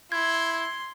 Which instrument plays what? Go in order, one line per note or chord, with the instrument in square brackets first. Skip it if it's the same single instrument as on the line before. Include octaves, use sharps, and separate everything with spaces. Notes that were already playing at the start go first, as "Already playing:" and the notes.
[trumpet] E4 [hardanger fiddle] C6 [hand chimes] G#6